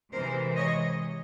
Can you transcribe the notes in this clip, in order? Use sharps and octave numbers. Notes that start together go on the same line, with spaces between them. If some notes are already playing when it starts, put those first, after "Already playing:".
C3 E3 G#3 A#4 C5
C#5 D#5